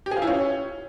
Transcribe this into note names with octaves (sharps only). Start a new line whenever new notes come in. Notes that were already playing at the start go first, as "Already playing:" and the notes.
G4
G#4
F4
E4
C#4